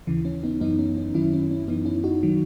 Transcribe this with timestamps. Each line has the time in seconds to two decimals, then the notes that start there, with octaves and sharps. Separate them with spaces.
0.07 D#2 C#3 E3
0.25 C#4
0.43 B3 D#4
0.61 F#2 E3 B3 D#4
0.79 C#4
0.97 C#4
1.14 F#2 D#3 F#3 C#4 E4
1.33 C#4
1.51 C#4
1.68 F#2 E3 B3 D#4
1.85 C#4 E4
2.04 D#4 F#4
2.23 D#3 F#3